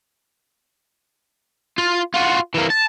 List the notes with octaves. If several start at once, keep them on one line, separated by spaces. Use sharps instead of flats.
F4
F4 F#4
E3 A#3
A5